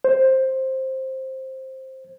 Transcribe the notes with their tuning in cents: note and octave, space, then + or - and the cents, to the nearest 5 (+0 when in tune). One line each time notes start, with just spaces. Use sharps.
C5 +10